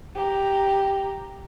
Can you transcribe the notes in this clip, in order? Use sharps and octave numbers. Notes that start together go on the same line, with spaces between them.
G4 A#5